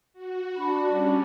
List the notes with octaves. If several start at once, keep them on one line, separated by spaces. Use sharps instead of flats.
F#4
D4 B5
G3 C#4